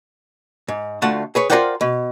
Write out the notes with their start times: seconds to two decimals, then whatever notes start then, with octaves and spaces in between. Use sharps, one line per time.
0.68 G#2
1.02 D2 A3 F4 F#5 A5
1.35 G#4 B4 C#5
1.50 F4 A#4 C5 D5 F#5 G5
1.81 B2